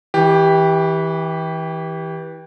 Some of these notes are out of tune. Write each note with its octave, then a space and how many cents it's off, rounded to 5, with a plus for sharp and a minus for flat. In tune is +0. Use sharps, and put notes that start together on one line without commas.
E3 -25 G4 +5